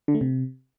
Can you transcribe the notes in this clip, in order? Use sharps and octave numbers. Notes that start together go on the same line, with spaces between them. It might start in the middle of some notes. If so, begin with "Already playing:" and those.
D3
A3
C3